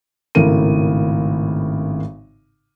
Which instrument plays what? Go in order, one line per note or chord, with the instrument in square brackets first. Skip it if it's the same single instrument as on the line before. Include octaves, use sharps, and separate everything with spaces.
[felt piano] G#1 A2 C#3 A#4 D#7